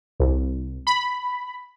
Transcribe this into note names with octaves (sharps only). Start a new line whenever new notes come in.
C2
B5